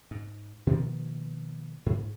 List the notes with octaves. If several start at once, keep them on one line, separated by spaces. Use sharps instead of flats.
G#2
B2 D#3 F3 A#3
G#2